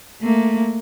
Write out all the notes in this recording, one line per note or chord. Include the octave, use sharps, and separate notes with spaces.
A3 A#3